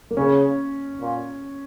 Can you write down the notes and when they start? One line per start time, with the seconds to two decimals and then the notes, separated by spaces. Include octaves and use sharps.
0.11 A#3
0.17 C#3 C#4
1.01 A#2